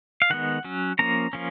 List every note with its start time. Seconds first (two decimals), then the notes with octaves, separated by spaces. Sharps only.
0.22 F5
0.30 D#3 G#3 B3 F#5
0.64 F#3 C#4
0.99 F3 A#3 C#4 A#5
1.33 F3 A#3 C#4